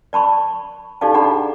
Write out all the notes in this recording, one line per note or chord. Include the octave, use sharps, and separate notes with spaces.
D5 A5 B5 C#6
D#4 G4 A4 D5 F5 A5
D4 G#4 D5 F#5 A#5 B5